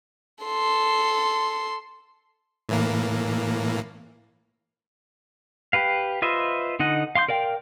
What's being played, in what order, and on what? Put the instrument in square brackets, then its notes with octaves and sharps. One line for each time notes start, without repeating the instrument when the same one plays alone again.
[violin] A4 C6
[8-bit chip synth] A2 E3 A#3
[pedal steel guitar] G4 B4 F5
F4 B4 C5 D#5 E5
D3 D#4 D#5 F#5
F5 C6 D6 G6
A#4 D5 F5 G5